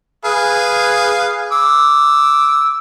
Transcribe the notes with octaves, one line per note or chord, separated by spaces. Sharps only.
G#4 B4 F5
D6 E6